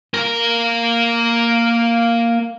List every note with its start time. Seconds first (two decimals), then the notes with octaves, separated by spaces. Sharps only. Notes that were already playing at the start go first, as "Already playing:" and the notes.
0.14 A#3 A#4